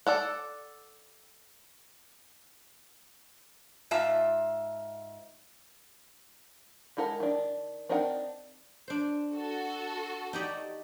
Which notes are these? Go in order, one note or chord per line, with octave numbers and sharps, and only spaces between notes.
A4 D5 F#5
G#2 F4 E5 A5
G#3 E4 A4 A#4 F#5
D#3 D4
C4 D4 D#4 A#4 F#5
D4 C5
F#4 A4
D#4 G4 D5